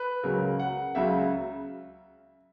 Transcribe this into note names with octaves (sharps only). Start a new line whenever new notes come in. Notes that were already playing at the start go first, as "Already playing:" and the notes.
Already playing: B4
C#2 C#3 F#3 A#4
F#5
C#2 C#3 F#3 E5